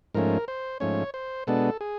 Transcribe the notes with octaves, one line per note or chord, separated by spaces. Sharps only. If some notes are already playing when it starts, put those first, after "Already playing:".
G#2 F3 A3 C#4 A#4
C5
G#2 F3 A3 C#4 C#5
C5
B2 G#3 B3 D4 A4
G#4